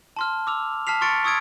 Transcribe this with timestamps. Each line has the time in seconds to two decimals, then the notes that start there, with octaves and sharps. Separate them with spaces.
0.16 A5 C6 F6
0.47 D6 E6 F7
0.87 A5 F6 B6 C7 F7
1.01 C6 C#6 F6 A6 C#7 D7
1.24 C#6 D#6 E6 G#6 D7